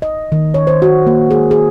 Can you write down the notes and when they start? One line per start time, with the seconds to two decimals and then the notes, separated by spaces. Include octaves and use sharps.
0.02 D#5
0.32 D#3
0.54 C#5
0.67 C5
0.82 F#4
1.07 A#3
1.31 G#4
1.51 G#4